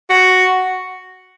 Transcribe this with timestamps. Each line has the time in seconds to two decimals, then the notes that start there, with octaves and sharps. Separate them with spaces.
0.10 F#4